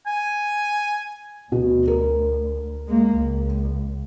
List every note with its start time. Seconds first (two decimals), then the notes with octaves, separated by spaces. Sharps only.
0.07 G#5
1.52 D2 B2
1.88 A#4
2.87 G#3 A#3
3.16 C#2